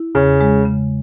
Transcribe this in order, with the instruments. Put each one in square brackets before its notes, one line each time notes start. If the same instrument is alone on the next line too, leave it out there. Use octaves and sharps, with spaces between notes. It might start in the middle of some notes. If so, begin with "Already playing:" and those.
Already playing: [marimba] E4
[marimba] E2 [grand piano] C#3
[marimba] G#3
C#3